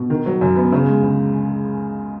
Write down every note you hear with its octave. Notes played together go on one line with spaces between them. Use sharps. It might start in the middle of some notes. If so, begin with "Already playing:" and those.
Already playing: B2
D#3
F#3
F#2
B3
C#3
G#3
C#2